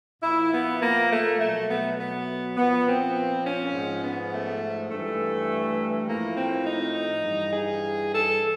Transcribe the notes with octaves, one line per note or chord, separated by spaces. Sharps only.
A#2 F3 E4
B3
A#3
A3
B2 F#3 A3
B3
B3
A#2 F3 B3
C4
C#4
G#2 F3
B3
A3
G2 E3 A3
A2 F3 A#3
C4
D#4
G2 E3
G#4
A4